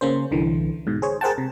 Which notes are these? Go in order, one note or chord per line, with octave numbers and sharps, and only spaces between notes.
C#3 A#3 C#4 C5
C2 D3 E3
G#2 B2
G#4 C5 C#5
G#4 A#4 C5 F#5 G5 A5
C3